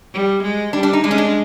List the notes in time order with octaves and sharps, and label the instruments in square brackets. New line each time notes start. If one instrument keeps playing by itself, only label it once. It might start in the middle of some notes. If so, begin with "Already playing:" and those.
[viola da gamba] G3
G#3
[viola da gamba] G3 [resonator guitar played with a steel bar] D4
[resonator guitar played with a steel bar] D4
D#4
[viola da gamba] G#3 [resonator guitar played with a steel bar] D4
[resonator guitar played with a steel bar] C#4
D4